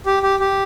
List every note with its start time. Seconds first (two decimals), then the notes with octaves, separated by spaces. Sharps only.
0.06 G4
0.23 G4
0.40 G4